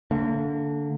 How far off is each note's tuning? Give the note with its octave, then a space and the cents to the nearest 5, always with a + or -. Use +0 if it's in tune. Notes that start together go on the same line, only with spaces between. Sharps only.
D3 -15 A#3 -35